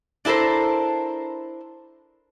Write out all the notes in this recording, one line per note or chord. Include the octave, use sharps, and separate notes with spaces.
D4 E4 A4 A#4 C5